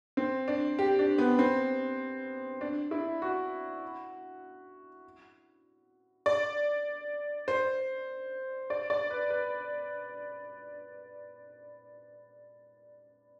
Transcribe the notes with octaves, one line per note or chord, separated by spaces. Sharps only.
C4
D4
G4
D4
B3
C4
D4
E4
F#4
D5
C5
D5
D5
B4
B4